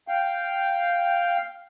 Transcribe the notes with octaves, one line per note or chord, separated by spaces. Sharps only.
F5 G5